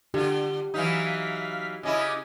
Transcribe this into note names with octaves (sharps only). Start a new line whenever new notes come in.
D3 F4 G4
E3 F#3 D#4 F5 F6 B6
C#3 C#4 E4 D#5 D6 D#6